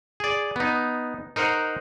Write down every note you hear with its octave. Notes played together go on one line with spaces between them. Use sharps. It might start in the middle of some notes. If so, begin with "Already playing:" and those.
G#4 D5
B3 D#4
D#4 A#4 C5 F#5